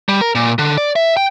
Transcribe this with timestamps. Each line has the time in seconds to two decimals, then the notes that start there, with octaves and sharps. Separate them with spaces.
0.09 G3
0.21 A#4
0.35 A#2
0.59 D3
0.78 D5
0.96 E5
1.17 G5